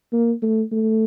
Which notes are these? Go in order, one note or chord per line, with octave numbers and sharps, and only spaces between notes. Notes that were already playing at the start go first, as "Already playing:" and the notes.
A#3
A3
A3